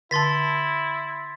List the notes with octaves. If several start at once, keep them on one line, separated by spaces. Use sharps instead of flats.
D3 E4 A5 C6 A6 B6